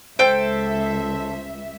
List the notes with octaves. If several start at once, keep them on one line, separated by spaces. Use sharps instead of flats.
C#2 A4 C5 E5 G5 G6